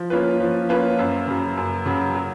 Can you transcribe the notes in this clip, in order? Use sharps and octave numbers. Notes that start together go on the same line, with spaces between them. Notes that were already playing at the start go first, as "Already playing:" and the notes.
Already playing: F3
A#3 C#4 F4 B4
F3
A#3 C#4 F4 B4
F#2
C#3 F#3
F#2
C#3 F#3
F#3